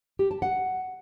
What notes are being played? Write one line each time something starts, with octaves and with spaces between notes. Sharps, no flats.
G4
A5
F#5